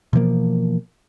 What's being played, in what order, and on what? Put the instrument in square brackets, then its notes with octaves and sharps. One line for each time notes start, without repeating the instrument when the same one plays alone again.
[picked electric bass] B2 E3 F3 A#3